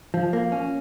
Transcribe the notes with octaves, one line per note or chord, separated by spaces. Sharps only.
F3
A#3
C#4